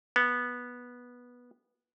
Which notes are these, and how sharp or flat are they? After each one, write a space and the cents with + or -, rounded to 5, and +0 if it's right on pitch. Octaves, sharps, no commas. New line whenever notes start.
B3 -10